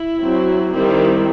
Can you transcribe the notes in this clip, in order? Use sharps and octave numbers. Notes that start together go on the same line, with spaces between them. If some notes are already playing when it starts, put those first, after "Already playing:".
Already playing: E4
F#3 C4
D#3 G3 C4 E4